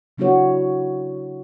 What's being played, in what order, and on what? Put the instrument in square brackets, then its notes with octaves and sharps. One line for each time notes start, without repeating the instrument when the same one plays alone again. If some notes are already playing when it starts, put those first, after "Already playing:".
[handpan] C#3 F#3 D4 E4 F#4 C#5